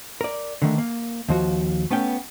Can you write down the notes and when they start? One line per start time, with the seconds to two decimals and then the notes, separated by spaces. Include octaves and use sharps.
0.21 A#4 D5
0.62 D3 D#3 A3
0.78 A#3
1.29 D#2 F3 F#4
1.91 A3 B3 C#4 G5